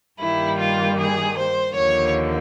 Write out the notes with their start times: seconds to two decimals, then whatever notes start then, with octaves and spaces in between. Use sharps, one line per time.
0.20 G2 D#3 G3 A#3 E4
0.58 F4
0.98 G#4
1.37 C5
1.75 D#2 D3 F3 A#3 C#5